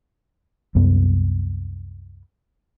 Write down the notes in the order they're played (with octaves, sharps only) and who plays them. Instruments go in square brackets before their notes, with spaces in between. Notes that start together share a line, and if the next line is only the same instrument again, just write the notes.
[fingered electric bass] C2 F#2 B3